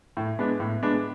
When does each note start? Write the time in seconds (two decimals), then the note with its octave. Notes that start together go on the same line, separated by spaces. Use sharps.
0.17 A2
0.39 G#3 B3 D4
0.60 A2
0.83 G#3 B3 D4